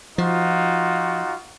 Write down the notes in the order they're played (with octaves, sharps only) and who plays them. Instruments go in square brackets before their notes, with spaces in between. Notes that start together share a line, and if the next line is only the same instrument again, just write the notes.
[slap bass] F3 [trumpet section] D#4 F4 F#4